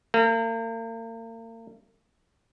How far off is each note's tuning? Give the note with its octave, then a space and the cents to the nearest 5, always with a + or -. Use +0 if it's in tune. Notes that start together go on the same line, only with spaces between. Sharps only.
A#3 -40